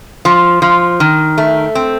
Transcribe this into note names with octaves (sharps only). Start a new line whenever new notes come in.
F3
F3
D#3
A3
C4